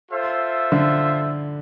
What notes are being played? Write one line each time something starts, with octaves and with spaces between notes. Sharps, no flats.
F4 A4 C5 E5
D3